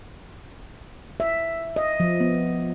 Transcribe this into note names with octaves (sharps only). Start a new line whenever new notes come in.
E5
D#5
F3
B3